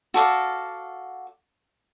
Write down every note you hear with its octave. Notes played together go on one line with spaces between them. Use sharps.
F#4 A4 D5 F5